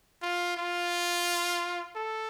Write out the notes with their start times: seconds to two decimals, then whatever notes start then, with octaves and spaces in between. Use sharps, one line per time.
0.23 F4
0.57 F4
1.97 A4